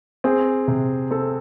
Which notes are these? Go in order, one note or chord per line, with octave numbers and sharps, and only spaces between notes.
C4 G#4
C3
C4 A4